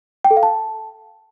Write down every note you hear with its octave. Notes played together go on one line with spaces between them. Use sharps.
G5
A4
F5
A5